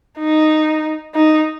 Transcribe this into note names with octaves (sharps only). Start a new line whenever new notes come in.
D#4
D#4